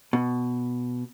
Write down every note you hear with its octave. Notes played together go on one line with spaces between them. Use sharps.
B2